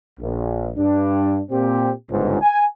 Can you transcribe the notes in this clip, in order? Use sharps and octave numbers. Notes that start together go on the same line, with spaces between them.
A#1
G2 D4
A#2 C4 G4
G1 C#2 G#2
G#5